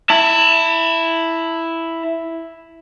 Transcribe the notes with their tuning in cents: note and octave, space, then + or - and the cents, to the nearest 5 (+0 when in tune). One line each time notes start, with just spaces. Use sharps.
E4 +0 A5 +35